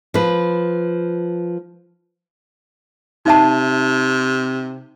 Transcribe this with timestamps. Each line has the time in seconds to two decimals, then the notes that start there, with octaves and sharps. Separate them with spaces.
0.14 F3 B4
3.26 C3 D#4 E5 A5